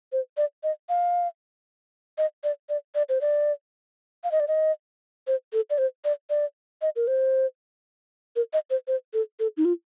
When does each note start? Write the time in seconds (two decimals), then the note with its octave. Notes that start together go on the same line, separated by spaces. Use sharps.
0.12 C5
0.37 D5
0.63 D#5
0.89 F5
2.18 D#5
2.44 D5
2.69 D5
2.95 D5
3.09 C5
3.21 D5
4.24 F5
4.32 D#5
4.40 D5
4.48 D#5
5.27 C5
5.53 A4
5.70 D5
5.78 C5
6.05 D5
6.30 D5
6.82 D#5
6.96 A#4
7.07 C5
8.36 A#4
8.53 D#5
8.70 C5
8.88 C5
9.14 A4
9.40 A4
9.57 D#4
9.65 F4